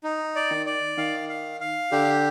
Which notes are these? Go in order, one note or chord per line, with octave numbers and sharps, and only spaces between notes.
D#4
D5
D#3
D5
D#3 F5
F5
F5
D3 G4